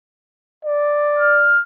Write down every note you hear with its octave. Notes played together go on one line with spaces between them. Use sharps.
D5
F6